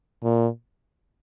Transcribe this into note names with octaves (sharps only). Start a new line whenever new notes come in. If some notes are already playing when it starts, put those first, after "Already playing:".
A#2